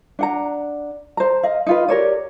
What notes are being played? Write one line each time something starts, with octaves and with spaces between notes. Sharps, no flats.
D4 F#5 A#5
C5 A#5
D#5 F5
D#4 F4 B4
G4 A#4 C#5 D5